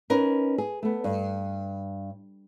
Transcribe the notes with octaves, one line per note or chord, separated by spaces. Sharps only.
C#4 D#4 A#4 B4
G#4
A3 B3
G2